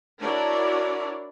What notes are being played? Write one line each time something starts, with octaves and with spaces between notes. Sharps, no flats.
D4 E4 F#4 A#4 C#5 D5